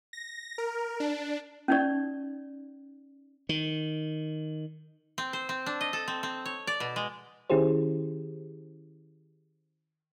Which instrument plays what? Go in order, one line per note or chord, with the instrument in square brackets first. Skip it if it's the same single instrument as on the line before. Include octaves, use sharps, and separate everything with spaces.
[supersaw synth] A#6
A#4
D4
[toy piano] C#4 D#4 D5
[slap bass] D#3
[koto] C4
C5
C4
D4
D#5
A4
C4
C4
C#5
D5
B2
G#3
[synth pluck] D#3 C#4 E4 G4 G#4 C5